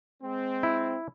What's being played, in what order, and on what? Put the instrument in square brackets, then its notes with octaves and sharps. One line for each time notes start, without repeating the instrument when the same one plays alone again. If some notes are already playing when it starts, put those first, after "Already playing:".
[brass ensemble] G#3 C4
[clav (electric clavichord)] E4